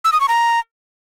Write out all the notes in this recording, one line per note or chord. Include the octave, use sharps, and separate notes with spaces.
E6
D#6
C#6
A#5